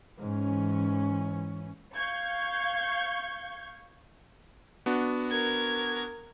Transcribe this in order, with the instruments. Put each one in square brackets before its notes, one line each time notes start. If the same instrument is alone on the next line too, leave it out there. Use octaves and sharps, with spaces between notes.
[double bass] G#2 [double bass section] E3 C#4
[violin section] F5 C#6 G6 G#6
[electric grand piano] B3 D4 F#4
[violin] A#4 G#6